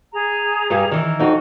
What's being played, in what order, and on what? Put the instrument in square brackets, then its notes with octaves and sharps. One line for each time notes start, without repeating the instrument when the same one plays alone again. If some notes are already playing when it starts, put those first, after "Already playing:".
[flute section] G#4 A#5
[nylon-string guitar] G2 G3
D#3 E3
[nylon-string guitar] F2 D#4 [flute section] F#4